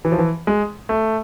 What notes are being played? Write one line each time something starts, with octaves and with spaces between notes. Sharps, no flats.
E3
F3
E3
G#3
A3